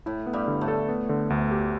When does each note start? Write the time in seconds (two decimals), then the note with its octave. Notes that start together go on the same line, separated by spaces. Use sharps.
0.06 A2 E4
0.26 B3
0.33 G2 G3
0.48 D3
0.61 A2 A3
0.68 A4
0.89 B3
1.09 D3
1.30 D2
1.51 G4